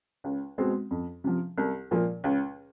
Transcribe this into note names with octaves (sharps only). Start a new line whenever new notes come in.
C#2
B2 G#3 C4
F2
C3 F3
C2
A#2 F3 A#3
C#2